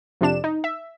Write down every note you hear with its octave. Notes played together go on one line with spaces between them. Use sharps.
F2 C3 D4 E7
D#4
E5